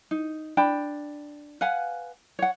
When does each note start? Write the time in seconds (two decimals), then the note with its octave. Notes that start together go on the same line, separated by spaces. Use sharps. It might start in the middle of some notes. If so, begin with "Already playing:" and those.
0.11 D#4
0.57 D4 G5 B5
1.61 B4 F5 F#5 G#5
2.39 C#5 F#5